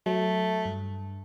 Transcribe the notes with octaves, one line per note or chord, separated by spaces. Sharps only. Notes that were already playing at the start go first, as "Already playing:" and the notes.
F#3 A3
G2